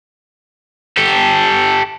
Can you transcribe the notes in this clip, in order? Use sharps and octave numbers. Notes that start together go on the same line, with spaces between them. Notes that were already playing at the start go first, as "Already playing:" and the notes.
G4 A4